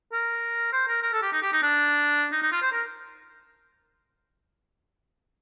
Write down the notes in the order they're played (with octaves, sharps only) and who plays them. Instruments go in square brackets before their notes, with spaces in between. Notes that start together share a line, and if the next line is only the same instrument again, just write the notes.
[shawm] A#4
C5
A#4
A#4
A4
G4
D#4
G4
D#4
D4
D#4
D#4
F4
C5
A#4